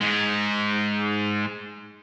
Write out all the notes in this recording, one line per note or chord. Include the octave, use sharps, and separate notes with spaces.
G#2 G#3